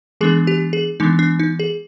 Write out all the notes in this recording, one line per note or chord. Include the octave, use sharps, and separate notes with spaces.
E3 G#3 B3 D4 G#4
G4
G#4
E3 G#3 B3 D4 D#4
D4
D#4
G#4